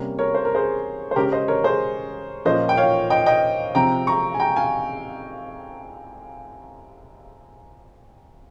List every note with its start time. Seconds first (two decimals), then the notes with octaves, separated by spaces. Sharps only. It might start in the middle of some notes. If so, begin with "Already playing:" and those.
Already playing: C3 G3 A#3 C#4
0.19 A#4 C#5
0.35 C5
0.45 A#4
0.55 G#4 C5
1.11 C5
1.16 C#3 G#3 C#4 G4 A#4
1.32 C5 D#5
1.48 A#4 C#5
1.64 G#4 C5
2.45 A#2 F3 A#3 C#4 C5 D#5
2.69 G5
2.77 C#5 F5
3.10 D#5 G5
3.26 D#5 G5
3.75 C3 F3 C4 G5 A#5
4.07 A#5 C#6
4.34 G#5
4.39 G5 A#5
4.56 F5 G#5